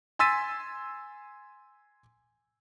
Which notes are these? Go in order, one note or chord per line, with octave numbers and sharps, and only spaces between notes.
G#5 C6 E6 A6 B6 D#7